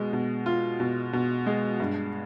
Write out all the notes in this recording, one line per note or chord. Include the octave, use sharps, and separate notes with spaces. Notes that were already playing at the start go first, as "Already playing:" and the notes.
Already playing: B2 G#3
B2
F4
B2
B2
G#3
G2